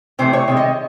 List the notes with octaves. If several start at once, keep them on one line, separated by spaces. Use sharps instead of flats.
C3 E3 A3 C5
C#5
C3 D#3 G#3
D#5